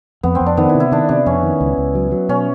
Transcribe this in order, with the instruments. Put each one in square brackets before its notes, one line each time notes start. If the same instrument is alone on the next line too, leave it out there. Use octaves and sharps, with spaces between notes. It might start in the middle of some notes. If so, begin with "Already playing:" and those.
[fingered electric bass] F2 [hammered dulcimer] B3
[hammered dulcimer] C4
[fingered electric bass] F2
[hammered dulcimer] D4
[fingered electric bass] D#3 [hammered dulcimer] B3
[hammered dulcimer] E4
[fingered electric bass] C3
[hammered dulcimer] E4
[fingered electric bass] D#3 [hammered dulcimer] D4
[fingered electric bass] C3 [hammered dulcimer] D4
[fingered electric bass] F2 [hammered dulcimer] C#4
[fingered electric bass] D#3
C#2
C#2
F#3
F#3
[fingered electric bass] B2 [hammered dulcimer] C#4